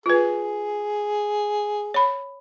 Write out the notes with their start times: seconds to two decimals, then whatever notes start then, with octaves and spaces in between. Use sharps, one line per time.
0.06 F4 G#4 B4
1.94 C#5 B5